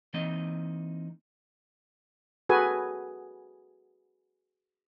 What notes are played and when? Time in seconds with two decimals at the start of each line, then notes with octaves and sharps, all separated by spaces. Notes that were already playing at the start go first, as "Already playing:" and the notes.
0.14 E3 A#3 C4 D#4 D#5
2.49 F#4 G#4 A4 B4 G#5